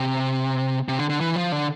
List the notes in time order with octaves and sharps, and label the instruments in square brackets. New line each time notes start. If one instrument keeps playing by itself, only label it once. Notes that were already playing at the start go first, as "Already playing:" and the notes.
Already playing: [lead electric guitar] C3
C3
D3
D3
E3
F3
D3